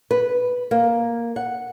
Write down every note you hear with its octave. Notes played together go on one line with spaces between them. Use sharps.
B4
A#3
F#5